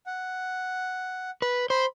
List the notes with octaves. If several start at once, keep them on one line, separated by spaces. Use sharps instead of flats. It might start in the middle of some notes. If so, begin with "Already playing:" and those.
F#5
B4
C5 B5